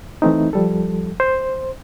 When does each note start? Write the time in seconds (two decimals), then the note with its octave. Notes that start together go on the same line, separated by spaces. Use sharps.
0.22 E3 A3 C4 D#4
0.53 F3 G3 A4
1.20 C5